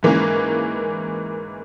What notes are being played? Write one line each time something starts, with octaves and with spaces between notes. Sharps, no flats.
G#2 E3 A#3 C#4